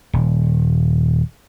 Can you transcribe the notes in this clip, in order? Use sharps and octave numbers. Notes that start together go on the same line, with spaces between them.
D#1